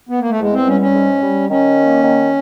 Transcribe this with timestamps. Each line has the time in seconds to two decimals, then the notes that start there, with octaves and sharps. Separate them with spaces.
0.09 B3
0.20 A#3
0.29 A3
0.40 E2 G#3
0.53 C4
0.67 G3 C#4
0.81 C#4
0.94 G#2
1.22 G3
1.49 D#3 C#4
1.76 A#3
2.03 D#3